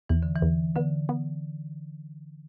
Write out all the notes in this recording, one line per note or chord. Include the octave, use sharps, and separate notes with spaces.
E2 E3
D3
E3
E2
D3 B3
B3